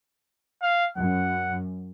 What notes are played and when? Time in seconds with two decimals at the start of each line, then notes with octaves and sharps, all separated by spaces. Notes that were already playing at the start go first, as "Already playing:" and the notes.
0.62 F5
0.97 F#2 F#5